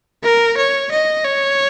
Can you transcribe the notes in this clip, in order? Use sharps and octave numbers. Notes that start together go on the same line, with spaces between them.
A#4
C#5
D#5
C#5